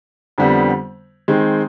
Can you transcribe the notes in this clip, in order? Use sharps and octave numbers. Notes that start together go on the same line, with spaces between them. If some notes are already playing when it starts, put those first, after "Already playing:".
F2 D3 G3 B3
D#3 G#3 C4